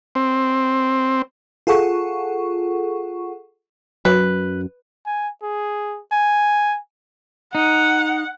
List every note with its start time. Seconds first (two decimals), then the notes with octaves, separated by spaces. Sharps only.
0.15 C4
1.67 F4 G#4 A4 F#5 C#6
4.05 F#2 B4
5.06 G#5
5.42 G#4
6.12 G#5
7.55 D#4 F#5